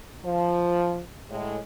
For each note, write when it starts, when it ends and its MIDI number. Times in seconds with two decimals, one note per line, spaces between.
0.25 1.01 53
1.30 1.57 45
1.30 1.57 56